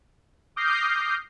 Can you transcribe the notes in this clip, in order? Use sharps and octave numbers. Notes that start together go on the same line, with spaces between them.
D6 D#6 F6 G6 A#6 C7